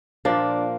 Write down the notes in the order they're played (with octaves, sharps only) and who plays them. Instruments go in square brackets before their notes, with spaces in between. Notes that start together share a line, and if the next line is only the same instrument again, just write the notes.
[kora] A#2 F3 A#3 D4